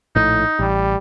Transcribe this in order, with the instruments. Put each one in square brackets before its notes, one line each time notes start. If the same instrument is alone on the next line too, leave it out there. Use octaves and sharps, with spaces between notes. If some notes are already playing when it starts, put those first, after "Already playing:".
[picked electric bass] A#1 A2 [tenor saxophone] D#4
[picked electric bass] A1 [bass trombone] G3